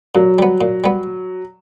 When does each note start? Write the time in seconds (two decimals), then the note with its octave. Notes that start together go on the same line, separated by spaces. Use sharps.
0.15 A#2 F#3
0.39 G3 B3
0.61 A#2
0.84 G3 B3